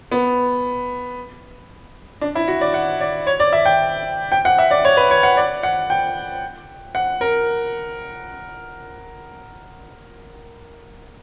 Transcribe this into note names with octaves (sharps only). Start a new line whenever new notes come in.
B3
D4
E4
F#4
D5
F#5
D5
C#5
D5
E5
G5
G5
F#5
E5
D5
C#5
B4
C#5
F#5
D5
F#5
G5
F#5
A#4